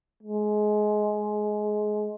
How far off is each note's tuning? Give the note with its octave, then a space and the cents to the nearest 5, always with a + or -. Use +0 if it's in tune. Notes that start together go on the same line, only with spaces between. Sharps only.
G#3 +20